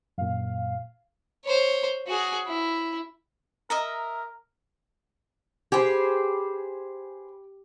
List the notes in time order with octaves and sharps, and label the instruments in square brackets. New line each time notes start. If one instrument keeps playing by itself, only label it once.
[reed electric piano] F#2 A#2 [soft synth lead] F5
[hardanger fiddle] C5 C#5
F#4 G#4
E4
[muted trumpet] A#4 [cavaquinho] D#5 E5 A#5
[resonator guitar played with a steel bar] G4 [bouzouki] G#4 B4 C5